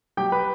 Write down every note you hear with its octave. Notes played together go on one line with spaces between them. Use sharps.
F#3 G4 G5
B4 B5